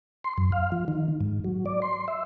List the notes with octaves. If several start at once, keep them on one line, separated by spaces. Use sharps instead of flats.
C6
F#2
F5
F3
D#3
G#2
F#3
D5
C6
E5